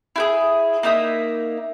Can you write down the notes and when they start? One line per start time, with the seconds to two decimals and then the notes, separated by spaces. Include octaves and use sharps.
0.16 E4 G4 G#4
0.83 A#3 D#4 E5 D#6